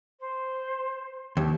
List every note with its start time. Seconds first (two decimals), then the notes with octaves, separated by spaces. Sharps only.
0.21 C5
1.37 D#2